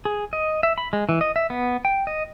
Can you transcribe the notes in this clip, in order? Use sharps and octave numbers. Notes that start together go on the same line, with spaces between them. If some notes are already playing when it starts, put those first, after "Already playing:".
G#4
D#5
E5
B5
G#3
E3
D#5
E5
B3
G5
D#5